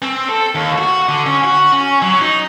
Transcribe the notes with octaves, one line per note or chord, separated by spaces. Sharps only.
C4
A4
D#2
F#4
D3
C#4
F#4
C#4
F#3
D#4